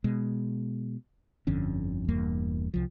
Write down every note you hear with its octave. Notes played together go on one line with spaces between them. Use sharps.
B2 G#3
G1 F2 D3 C#4
E1 E2 G2 A#3
C2 F3